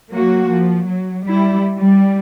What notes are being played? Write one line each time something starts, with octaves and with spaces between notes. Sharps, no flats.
F#3 A#3 F#4
F3
F#3
G3 E4
G3